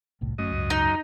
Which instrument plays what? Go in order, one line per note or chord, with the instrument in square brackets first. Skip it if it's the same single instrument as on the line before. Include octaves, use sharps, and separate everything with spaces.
[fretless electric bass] G1 C2 A2
[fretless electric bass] G1 A3 C#4 [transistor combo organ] F#2 D#5
[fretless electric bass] C#2 G#2
[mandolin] D#4